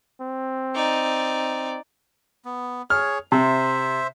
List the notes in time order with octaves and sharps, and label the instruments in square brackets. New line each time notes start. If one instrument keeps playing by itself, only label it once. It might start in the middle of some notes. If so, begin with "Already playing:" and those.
[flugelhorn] C4
[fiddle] D#4 D5
[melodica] B3
[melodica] G#4 C#5 [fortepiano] F6
[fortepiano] C3 [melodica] C5 E5